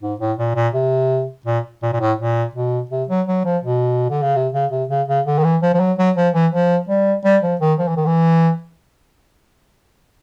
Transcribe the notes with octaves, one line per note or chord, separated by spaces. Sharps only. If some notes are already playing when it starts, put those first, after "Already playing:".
G#2
A2
A#2
A#2
C3
A#2
A#2
A#2
A2
A#2
B2
C3
F#3
F#3
F3
B2
D3
C#3
C3
C#3
C3
C#3
C#3
D3
D#3
E3
F3
F3
F#3
F#3
F3
E3
F3
G3
G3
F3
D#3
F3
E3
D#3
E3